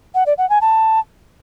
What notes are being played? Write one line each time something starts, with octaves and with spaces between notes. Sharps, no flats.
F#5
D5
F#5
G#5
A5